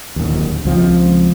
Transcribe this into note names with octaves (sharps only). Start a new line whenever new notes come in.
D1 D#2
C#2 F3 C4